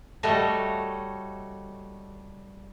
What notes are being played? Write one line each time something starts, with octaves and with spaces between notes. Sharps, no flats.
G3 A3 F#4 A4 C#5 D#5